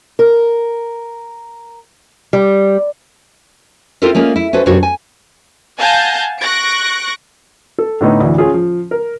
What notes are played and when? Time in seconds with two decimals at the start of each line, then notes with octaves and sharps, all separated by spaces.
0.19 A#4
2.33 G3
4.02 C4 E4 F4 A4 A#4
4.15 G#3 A#3 C#4 F4
4.36 E4
4.53 C#4 F#4 A4 B4 C5
4.66 F#2 C3 B3 D4 F#4 C#5
4.83 G#5
5.78 F5 F#5 G#5 A5 G6 A#6
6.41 C#6 F#6 A#6 D7
7.78 A4
8.01 A2 D3 A3 B3 D#4
8.20 D2 E3
8.38 C#4 F4 G#4
8.54 F3
8.91 A#4